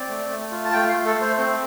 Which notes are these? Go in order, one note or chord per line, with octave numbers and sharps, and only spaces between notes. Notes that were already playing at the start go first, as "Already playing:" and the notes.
Already playing: C4 D5
A3
A3
F4
A5
A3 G5
F5
A3
A4
A3
C5
C4 C5